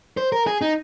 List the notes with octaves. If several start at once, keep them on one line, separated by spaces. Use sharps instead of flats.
C5
A#4
G#4
D#4